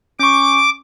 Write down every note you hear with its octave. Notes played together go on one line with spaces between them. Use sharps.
C#4 C#6 D6